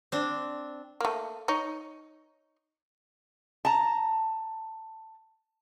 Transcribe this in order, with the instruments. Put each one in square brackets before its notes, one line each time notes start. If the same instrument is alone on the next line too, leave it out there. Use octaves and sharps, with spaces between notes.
[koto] C4 D4
[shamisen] A3 A#3
D#4 C#5
[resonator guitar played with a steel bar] A5 A#5